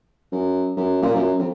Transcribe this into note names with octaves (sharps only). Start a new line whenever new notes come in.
F#2
F#2
A#2
F#2
F2